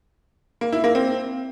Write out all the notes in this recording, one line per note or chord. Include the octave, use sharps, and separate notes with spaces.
A#3
E4
A#3
C4